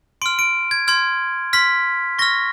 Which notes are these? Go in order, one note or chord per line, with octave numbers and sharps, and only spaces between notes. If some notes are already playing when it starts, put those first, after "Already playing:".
C6 F6 D7
D7
G#6
C6 F6 G#6
C6 F6 B6
C#6 F6 A#6